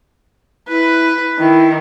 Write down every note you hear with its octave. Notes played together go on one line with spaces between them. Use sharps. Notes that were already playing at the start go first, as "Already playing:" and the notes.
E4 B4
D#3 E4